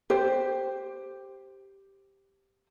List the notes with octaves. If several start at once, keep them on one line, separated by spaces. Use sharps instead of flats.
G4 C5